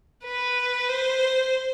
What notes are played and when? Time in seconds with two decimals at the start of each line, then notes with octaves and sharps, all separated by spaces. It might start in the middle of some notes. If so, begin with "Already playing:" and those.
0.24 B4
0.89 C5